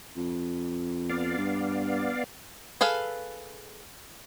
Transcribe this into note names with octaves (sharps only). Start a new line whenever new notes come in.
F2
B3 D5 F5
G2
G#4 A4 B4 F5